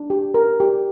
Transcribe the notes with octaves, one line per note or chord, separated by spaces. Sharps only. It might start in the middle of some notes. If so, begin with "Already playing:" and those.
Already playing: D4
G4
A#4
G4